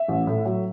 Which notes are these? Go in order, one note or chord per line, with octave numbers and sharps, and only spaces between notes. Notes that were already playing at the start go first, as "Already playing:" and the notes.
Already playing: E5
A1
A2
F#3